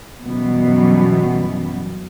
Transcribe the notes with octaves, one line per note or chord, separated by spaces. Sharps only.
F#2 B2 E3 G3 B3